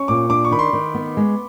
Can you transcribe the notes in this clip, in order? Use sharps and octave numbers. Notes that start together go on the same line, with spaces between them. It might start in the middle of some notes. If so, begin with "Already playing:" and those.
Already playing: C#4 C#6
A#2 D6
D4 D6
C#6
D#3 B5
C6
D#3
B3
G#3